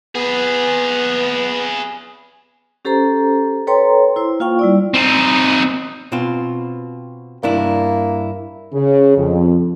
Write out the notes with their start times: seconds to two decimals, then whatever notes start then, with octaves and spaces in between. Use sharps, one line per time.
0.15 B3 G#4 B4
2.85 C#4 G4 A4 C5 A#5
3.67 A4 B4 C#5 G5 A#5 C6
4.16 E4 C5
4.40 A#3 F4 F5 G5 C#6
4.59 G3 E4 D5
4.94 C4 D#4
6.12 B2 C4 F4
7.43 G2 A#3 D4 E4
8.72 C#3
9.17 F2